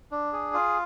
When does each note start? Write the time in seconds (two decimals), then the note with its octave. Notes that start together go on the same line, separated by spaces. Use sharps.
0.12 D4
0.33 G#4
0.54 F4